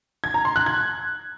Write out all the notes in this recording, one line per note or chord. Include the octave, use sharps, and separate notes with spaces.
G#6
A#5
C6
F#6
G#6